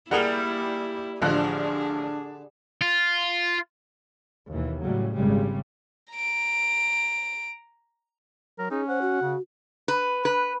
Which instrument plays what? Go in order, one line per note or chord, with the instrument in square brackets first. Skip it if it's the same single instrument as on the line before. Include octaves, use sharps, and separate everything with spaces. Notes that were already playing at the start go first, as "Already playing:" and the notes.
[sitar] G3 [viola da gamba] A#3 E4 [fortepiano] G#4 A#4 F#5
[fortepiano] A1 F3 F#6 [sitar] D3 [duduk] D4 [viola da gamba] G#4
[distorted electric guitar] F4
[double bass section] D#2 B2 E3
A2 C#3 F#3 G3
G#1 A#2 C#3 G3 G#3
[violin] A#5 D7
[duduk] F#3 [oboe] A#4
[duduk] C#4 [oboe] D#4 [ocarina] G#4
[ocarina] C5 [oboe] F#5
[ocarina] F#4
[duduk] C#3
[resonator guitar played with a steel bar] B4
B4